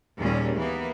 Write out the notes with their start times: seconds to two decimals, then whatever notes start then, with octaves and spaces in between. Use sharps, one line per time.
0.18 D#2 A#2 G3 C#4 G#4
0.56 E3 A#3 B3